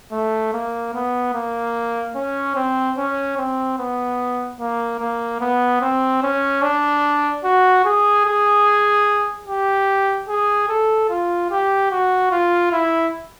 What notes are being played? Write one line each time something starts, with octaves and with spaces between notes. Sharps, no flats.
A3
A#3
B3
A#3
C#4
C4
C#4
C4
B3
A#3
A#3
B3
C4
C#4
D4
F#4
G#4
G#4
G4
G#4
A4
F4
G4
F#4
F4
E4